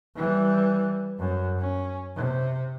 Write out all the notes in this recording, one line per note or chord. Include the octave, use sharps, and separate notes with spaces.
E3 G3
F#2
C#4
C3